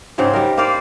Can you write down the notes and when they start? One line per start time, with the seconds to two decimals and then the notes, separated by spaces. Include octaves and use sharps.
0.18 G#2 C#3 C4 D#4
0.33 G3 A#4
0.57 A#3 C5 D5 F5